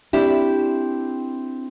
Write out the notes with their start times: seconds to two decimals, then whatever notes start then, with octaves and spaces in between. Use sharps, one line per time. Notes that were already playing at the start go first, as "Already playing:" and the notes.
0.13 C4 D4 E4 G4